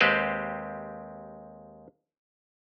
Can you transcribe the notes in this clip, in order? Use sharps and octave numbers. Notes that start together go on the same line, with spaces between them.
D#2 G#3 C4 G4 B4 C5